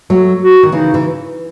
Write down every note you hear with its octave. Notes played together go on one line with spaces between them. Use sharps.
F#3 A3
F#4
D#3
C#3 E3 D#4
E3